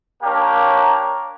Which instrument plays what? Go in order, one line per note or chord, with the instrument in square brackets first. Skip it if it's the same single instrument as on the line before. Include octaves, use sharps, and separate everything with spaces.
[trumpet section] A#3 D4 G4 A#4 C#5